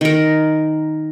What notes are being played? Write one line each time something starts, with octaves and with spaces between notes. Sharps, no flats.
D#3 A#4